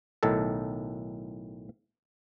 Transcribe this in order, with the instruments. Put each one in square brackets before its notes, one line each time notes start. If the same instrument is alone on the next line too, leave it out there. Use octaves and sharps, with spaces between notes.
[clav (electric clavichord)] B1 A2 D#3 A4